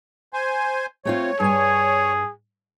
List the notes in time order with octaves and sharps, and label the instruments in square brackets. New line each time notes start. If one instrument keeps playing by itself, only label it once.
[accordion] C5 G#5
[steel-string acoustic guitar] A3 C4 F4 [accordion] C#5
[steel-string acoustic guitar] G2 G#5 [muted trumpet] G#4